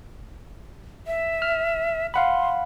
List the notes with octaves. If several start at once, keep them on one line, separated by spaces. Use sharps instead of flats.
E5
F6
F5 F#5 B5 C6